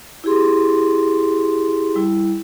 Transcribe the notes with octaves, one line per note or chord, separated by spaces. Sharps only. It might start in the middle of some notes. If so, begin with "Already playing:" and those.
E4 G4 G#4 C6
G3 E4